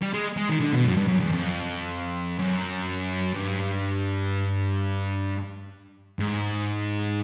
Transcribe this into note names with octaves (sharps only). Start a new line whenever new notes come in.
G3
G#3
G#3
D#3
D3
B2
F#2
G2
F#2
E2
F2
F#2
G2
G#2